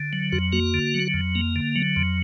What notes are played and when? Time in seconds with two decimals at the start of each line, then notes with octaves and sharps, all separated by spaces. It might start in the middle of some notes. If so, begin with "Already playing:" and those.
Already playing: D3
0.13 F#3
0.32 F2 F#4
0.53 A#3 F#4
0.74 D3
0.94 F#3
1.14 F2
1.35 A#3
1.56 D3
1.76 F#3
1.96 F2